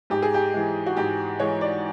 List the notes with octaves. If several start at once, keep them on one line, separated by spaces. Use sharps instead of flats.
G#2 G4
G#4
G4
E3 G#3
F#4
G#2 G4
E3 G#3 C#5
D5